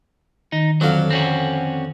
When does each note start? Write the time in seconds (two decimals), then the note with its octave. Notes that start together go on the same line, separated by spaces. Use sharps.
0.52 D#3 D#4
0.81 F2 D3 F#3 F5
1.11 C4 C#4 F#4